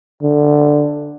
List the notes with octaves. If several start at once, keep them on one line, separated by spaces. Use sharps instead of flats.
D3